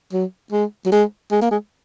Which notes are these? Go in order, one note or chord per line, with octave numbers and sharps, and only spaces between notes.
F#3
G#3
F#3
G#3
G#3
A#3
G#3